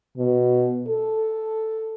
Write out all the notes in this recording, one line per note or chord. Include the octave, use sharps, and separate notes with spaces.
B2
A4